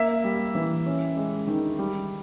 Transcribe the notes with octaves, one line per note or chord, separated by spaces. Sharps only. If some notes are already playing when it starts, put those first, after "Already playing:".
Already playing: A#3 E5
G3
E3
C#4
G#3
D#3
G3